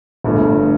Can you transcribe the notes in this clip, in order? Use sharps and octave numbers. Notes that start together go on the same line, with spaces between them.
G1 G2 F3 A3